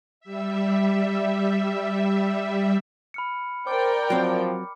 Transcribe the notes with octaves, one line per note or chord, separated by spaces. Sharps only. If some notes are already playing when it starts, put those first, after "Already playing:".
G3 E5
B5 F6 C#7
A#4 C5 D5 G5 D6
F3 F#3 C4